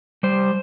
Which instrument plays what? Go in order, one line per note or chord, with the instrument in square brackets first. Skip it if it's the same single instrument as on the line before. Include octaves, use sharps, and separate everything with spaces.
[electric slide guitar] G3 C5